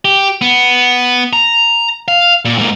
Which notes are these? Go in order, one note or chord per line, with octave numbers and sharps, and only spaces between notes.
G4
B3
A#5
F5
A#2
G#2 A#3